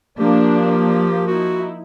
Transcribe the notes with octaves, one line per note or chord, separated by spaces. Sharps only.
F3 A#3 D4 G4
D#4 E4 F#4